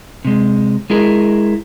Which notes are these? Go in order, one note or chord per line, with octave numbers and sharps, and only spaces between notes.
C3 G#3
G#3 E4 G#4 A#4